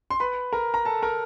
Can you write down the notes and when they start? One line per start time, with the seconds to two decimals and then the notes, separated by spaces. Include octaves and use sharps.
0.10 C6
0.20 B4 B5
0.53 A#4 A#5
0.74 A#5
0.85 A4 A5
1.02 A#4 A#5